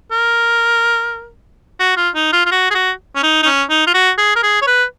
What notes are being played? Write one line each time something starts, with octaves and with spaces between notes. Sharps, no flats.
A#4
F#4
F4
D#4
F4
F4
F#4
G#4
F#4
C#4
D#4
D#4
C#4
D#4
F4
F#4
G#4
A#4
G#4
C#5
B4